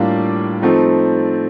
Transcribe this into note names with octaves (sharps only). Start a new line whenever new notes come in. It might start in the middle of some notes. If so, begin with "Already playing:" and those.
Already playing: A2 G3 A#3 D4 F4
F3 A3 C4 D#4